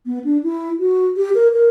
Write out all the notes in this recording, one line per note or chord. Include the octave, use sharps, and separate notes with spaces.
B3
D4
E4
F#4
G4
A#4
A#4